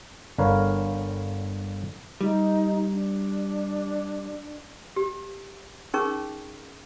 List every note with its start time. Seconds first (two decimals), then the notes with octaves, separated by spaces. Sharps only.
0.38 G1 D3 A#4 B4 C#5 F5
2.21 G3 D#4
2.92 D4
4.96 G4
5.94 C#4 D#4 G#4 A#4 C#6